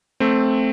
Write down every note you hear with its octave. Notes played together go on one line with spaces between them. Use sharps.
A3 C4